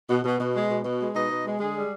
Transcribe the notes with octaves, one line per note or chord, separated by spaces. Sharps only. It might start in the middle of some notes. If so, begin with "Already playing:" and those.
B2
B2
B2
G#3
B2
B2
G#3
B2 D#4 D#5
B2
G#3
D3 G#3 G#4
G3